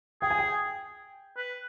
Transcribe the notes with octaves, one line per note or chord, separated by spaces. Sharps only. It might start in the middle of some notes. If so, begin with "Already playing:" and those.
G#4 G5
G#5
G5
B4